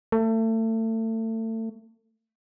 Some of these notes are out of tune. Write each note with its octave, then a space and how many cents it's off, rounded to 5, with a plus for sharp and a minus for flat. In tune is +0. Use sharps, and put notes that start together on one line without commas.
A3 +30